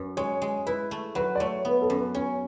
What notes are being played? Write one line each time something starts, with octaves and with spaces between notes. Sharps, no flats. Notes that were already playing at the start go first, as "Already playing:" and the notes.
Already playing: F#2
G#3 C#5
G#3
E4 B4
A3
F#3 B4
D5
A3 C#5
B3 C#5
A4
F#2
B4
C#4 C#5